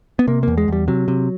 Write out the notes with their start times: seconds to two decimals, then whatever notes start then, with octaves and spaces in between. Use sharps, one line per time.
0.19 B3
0.27 C3 A#3
0.43 E2 A#3
0.58 G#3
0.68 E2 G3
0.88 C3 F#3
1.08 C3